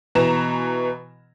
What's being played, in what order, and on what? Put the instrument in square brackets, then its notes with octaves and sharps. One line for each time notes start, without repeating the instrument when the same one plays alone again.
[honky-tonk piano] B2 E3 A#5 E7